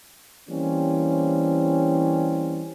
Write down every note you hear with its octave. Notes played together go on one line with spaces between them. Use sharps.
E3 G3 A#3 C4 C#4